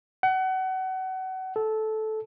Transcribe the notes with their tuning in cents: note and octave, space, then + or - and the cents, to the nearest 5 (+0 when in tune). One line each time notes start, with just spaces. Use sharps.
F#5 +30
A4 -15